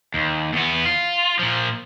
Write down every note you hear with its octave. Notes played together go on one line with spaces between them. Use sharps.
D#2
E2 B3
F4
A#2 F3